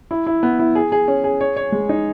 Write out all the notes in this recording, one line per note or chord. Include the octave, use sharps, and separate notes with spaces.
E4
E4
B3
E4
G#4
G#4
C#4
G#4
C#5
C#5
G#3
D#4